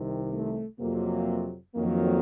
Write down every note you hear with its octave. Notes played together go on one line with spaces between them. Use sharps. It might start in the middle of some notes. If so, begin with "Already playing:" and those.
Already playing: C2 C3 D#3
A3
F2 C3 F#3 A#3
F2 D#3 F#3 A#3